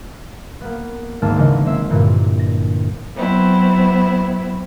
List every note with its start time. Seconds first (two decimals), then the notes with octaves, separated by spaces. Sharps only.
0.61 A#3 B3
1.22 G#1 D2 G#2 A#3 A5
1.37 C#3 E3 D#5
1.66 G#3 C4 E5
1.90 G2 A#2 D3 E3
2.39 A#6
3.15 F#3 B3 C4 E4